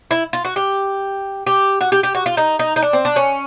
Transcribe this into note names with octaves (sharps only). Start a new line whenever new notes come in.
E4
F4
F#4
G4
G4
F#4
G4
G4
F#4
F4
D#4
D#4
D#4
D4
C4
D4
C#4